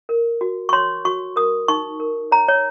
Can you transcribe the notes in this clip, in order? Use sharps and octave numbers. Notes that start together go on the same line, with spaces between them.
A#4
F#4
C#6
C#5 C6
F#4 C#6
A#4 D#6
D#4 C#6
A#4
C#5 A#5
C#5